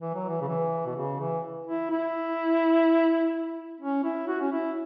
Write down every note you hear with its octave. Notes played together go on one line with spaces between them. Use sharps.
E3
F#3
E3
C#3
E3
B2
C#3
E3
E4
E4
C#4
E4
F#4
C#4
E4